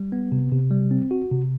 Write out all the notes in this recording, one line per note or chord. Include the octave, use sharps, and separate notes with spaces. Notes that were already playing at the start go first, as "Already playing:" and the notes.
Already playing: G3
B3
C3
C3
G3
C4
F#4
C3